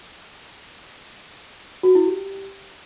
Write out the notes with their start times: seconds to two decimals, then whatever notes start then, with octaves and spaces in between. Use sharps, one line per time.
1.83 F#4
1.95 E4
2.07 G4